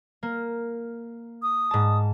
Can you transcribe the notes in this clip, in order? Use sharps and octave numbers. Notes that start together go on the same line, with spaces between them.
A#3
D#6
G#2 A5